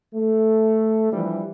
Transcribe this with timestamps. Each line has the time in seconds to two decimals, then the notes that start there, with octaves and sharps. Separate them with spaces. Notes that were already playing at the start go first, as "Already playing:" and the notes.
0.14 A3
1.11 E3 F3 G3 D4 E4